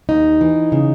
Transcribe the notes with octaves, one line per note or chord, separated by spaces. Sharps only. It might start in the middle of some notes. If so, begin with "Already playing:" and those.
D#2 D#4
E3
C#3